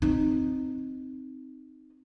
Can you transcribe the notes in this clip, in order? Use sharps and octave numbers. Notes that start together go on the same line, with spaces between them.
C4 D#4